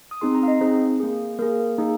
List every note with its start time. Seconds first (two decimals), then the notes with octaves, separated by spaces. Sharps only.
0.11 D#6
0.21 C4 D#4 G#4 C6
0.35 A#5
0.43 F5
0.48 D#5
0.61 C4 D#4 G#4 C5
1.00 A#3 G#4
1.39 A#3 G#4 A#4
1.78 A#3 D#4 G#4